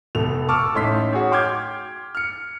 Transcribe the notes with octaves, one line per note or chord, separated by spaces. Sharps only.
F1 B2 A4 F7
A5 C#6 D6 E6 F6
A1 A2 D#4 C6 B6
F#4 G#4 C#5
G5 C6 D6 F6 G6 G#6
F6 C#7